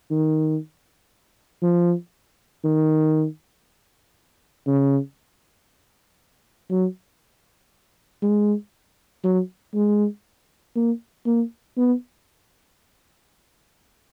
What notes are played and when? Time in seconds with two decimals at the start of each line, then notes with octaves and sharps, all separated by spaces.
0.11 D#3
1.63 F3
2.64 D#3
4.67 C#3
6.70 F#3
8.22 G#3
9.24 F#3
9.75 G#3
10.76 A#3
11.26 A#3
11.77 B3